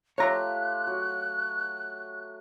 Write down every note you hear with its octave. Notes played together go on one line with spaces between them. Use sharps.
A3 F4 G4 C#5 A#5 F#6
F#3